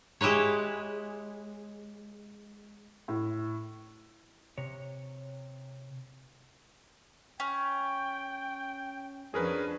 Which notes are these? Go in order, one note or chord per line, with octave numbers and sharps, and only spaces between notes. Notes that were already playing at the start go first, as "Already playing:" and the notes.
G#3 E4 G4 B4 C#5
A2
C3 C#5
C#4 G5
F2 F3 C#4 D4 G#4 A#4 B4